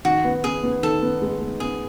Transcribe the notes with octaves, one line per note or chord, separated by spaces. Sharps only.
D#3 F#4
B3
B3 G#4
B3
D#3 A4
B3
G#3
B3
B3 G#4